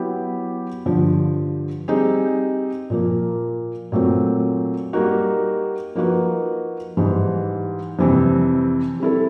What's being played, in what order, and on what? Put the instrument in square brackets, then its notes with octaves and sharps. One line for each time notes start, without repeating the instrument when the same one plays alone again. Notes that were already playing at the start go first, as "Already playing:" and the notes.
Already playing: [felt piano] F#3 B3 E4 G4
G2 D3 F3
G3 C4 D#4 G#4
A#2 F3 A#3
A#2 F#3 A3 C4
G3 A#3 D#4 F#4
F3 A#3 D#4 F#4 B4
G#2 E3 G3
F2 C3 E3 G3 C4
G3 C4 E4 A4